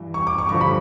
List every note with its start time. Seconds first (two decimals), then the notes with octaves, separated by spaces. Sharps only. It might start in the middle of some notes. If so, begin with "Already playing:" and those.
Already playing: G2 E3
0.14 C#6
0.27 D6
0.38 C#6
0.49 G2 D3 F3 C#6
0.61 B5